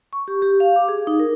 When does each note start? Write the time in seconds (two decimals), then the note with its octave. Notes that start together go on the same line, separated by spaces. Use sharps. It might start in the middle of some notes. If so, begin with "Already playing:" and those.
0.13 C#6
0.28 G4
0.42 G4
0.60 F5
0.76 D6
0.89 G#4
1.07 D#4
1.19 A#4